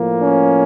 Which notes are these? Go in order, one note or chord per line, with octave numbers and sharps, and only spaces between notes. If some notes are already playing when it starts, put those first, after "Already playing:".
Already playing: A2 F3 A#3
C#4